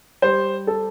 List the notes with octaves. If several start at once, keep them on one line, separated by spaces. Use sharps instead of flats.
G3 C5
A4